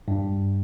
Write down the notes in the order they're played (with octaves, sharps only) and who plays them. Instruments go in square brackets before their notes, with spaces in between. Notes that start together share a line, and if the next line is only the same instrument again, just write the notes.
[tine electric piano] G2